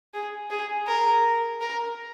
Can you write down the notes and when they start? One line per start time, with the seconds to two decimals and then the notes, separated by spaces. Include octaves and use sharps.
0.14 G#4
0.50 G#4
0.87 A#4
1.61 A#4